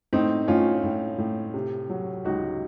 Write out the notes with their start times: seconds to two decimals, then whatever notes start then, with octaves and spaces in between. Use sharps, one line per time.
0.13 A2 C4 D#4
0.48 A2 C#4 F4
0.84 A2
1.18 A2
1.54 C3
1.90 F#3
2.25 C#2 D#4 F#4